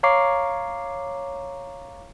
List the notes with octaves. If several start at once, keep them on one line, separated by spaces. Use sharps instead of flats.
C#5 F5 A#5 C#6 D6 C7